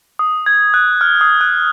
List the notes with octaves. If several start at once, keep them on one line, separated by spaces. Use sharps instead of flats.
D#6
G#6
F#6
F6
D#6
F#6